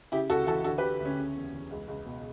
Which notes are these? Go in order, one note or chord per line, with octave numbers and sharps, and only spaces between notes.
C#3 E4 G4
C#2 F#4 A4
E3 F#4 A4
D3 F#4 A4
G4 B4
D3
D2
C#4
C#3
E2
E2
C#2
C#2
B2